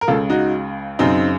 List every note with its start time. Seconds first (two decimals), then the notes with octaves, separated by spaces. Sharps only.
0.01 A#4
0.07 C#2 C#3 F4 A4
0.30 D#4 F#4
0.99 F#2 C#3 C4 D#4